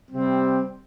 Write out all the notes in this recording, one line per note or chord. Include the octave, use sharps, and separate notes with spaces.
C3 G3 C4